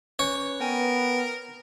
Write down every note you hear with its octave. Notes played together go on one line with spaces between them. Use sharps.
C#4 B4 C#5
B3 A#4 G5 G#5